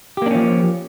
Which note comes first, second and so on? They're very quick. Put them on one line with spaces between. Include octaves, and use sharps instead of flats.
G4 A#3 D4 C#4 F3